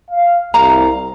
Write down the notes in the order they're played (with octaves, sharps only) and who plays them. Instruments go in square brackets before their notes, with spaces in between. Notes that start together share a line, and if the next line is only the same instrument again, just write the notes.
[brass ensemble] F5
[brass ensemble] C2 [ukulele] F5 A#5